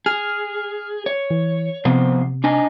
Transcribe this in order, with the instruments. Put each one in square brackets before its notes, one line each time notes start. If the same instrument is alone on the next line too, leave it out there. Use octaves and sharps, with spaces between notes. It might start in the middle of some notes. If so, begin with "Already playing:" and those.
[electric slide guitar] G#4 [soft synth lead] F6
[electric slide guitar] C#5
[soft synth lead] E3
[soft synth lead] C3 [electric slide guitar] F3 B3 C5
[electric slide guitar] D4 D#4 G#5